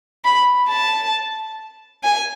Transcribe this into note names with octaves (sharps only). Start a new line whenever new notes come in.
B5
A5
G#5